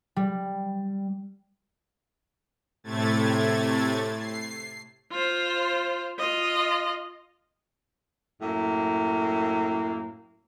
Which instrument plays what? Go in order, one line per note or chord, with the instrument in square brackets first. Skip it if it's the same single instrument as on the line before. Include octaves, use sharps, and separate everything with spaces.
[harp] G3
[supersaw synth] A2 C3 A3 G#6 A6
C7
[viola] F4 C5
F4 D#5
[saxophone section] F#2 A2 A#3